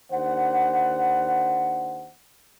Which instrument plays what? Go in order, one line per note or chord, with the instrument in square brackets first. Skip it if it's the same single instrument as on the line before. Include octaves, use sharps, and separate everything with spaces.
[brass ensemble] D#2 D4 C5 F#5